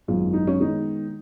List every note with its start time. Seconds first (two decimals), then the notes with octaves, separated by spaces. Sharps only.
0.08 G#1 F#2 D#3 G#3 B3 F4
0.33 D#4
0.47 C#4
0.60 D#3 G#3 B3 D#4